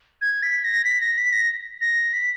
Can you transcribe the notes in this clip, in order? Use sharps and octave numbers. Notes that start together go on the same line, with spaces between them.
G#6
B6
A#6
B6
A#6
B6
A#6
A#6
B6